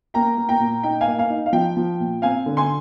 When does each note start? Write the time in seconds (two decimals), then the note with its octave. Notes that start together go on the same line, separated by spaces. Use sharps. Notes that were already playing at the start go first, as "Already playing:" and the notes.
0.14 A#3 G5 A#5
0.37 A#3
0.49 G5 A#5
0.60 A#2
0.83 D#4 G5
1.01 F5 G#5
1.07 A#3
1.18 F5 G#5
1.30 D#4
1.46 F5
1.53 F3 G5
1.77 F3
2.00 A#2
2.22 C4 F5 G#5
2.46 D3
2.57 G#5 C6